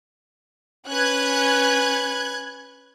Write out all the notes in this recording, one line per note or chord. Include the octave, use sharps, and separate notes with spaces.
C#4 B4 F#6 G#6